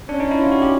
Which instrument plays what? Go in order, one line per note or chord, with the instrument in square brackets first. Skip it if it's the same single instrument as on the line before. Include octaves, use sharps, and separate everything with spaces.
[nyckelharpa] C#4 [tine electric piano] D4
[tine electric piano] D#4
E4
F4
F#4
G4